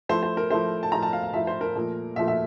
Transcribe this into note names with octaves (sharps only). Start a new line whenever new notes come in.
F3 A3 E4 C5
C5
A#4
F3 A3 E4 C5
A5
F3 A3 E4 A#5
A5
F5
F5
F3 A3 E4 E5
C5
A#4
A#2 F3 A3
A#2 F3 A3 E5
E5